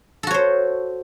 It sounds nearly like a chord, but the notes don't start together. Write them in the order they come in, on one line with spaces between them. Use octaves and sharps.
A4 F#4 C#5 C5